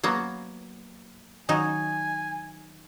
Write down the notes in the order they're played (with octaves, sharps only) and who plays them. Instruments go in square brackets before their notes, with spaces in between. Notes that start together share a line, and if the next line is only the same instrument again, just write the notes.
[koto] F#3 A#3 B3
[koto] D#3 F#3 D#4 [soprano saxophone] G#5